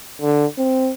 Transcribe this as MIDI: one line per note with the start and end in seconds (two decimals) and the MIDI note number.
0.22 0.46 50
0.58 0.91 60